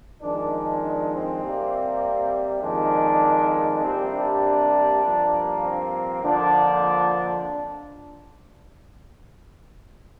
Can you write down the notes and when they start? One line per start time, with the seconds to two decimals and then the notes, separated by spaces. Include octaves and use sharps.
0.22 F2 D#3 G#3 D4
0.82 D4
1.12 C4
1.43 C3 G3 A#3
2.63 F2 D#3 G#3 D4
3.83 C3 G3 A#3 C4
4.13 D4
5.04 G2 F3 A#3
5.63 C4
6.23 F2 D3 F3 A#3 D4